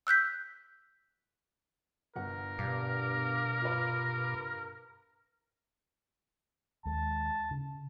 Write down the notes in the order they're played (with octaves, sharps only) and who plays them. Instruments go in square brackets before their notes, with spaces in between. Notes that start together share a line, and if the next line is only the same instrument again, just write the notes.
[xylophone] E6 F#6 G6 B6
[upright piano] G1 F#5 [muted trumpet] A#4
[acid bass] G2 [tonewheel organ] B2 F5 D6
[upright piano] F4 B4
[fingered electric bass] D#2 G#3 [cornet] A5
[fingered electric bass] C#3